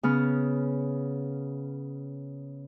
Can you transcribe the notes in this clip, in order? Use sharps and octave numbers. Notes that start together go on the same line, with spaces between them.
C#3 B3 F6